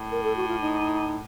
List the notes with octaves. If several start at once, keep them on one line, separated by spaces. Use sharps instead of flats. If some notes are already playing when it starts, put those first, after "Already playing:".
Already playing: A2
A#4
A4
F#4
F4
D#4